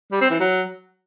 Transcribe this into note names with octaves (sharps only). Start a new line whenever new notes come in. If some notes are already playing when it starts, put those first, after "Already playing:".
G3
C4
E3
F#3